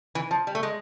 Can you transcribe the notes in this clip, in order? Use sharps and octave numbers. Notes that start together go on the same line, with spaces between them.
E3
F3
G3
A3
G#3